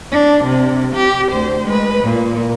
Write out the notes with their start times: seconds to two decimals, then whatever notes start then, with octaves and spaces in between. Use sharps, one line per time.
0.11 D4
0.44 C3
0.95 G4
1.31 D2 C5
1.66 G#3 B4
2.04 A#2